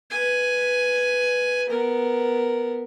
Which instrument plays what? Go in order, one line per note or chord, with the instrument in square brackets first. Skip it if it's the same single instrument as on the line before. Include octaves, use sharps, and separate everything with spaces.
[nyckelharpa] B4 G#5
B3 A#4